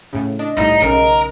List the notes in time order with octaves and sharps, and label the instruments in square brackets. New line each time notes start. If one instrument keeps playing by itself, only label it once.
[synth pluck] A2 C#3
[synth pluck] D4 [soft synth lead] D#5
[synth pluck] C2 A2 [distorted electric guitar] D#4
[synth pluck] B1 C#3 [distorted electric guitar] A#4